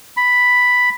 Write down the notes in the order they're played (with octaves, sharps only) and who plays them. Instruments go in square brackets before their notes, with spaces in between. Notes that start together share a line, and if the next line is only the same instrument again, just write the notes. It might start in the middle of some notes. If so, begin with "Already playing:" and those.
[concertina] B5